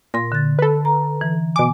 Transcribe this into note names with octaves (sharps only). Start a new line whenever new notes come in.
A#2 C6 A#6
D3 A6
A4 B4
A#5
E3
B2 G#5 D6